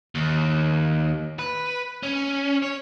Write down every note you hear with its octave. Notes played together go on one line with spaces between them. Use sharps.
D#2
B4
C#4
C#5